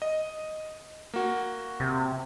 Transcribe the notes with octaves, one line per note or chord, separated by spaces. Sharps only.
D#5
A#3 F#4
C3